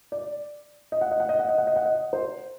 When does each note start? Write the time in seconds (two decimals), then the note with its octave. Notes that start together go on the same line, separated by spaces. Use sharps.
0.12 D5
0.92 D#5
1.01 F#5
1.11 D#5
1.20 F#5
1.29 D#5
1.39 F#5
1.49 D#5
1.58 F#5
1.67 D#5
1.76 F#5
1.85 D#5
2.13 C5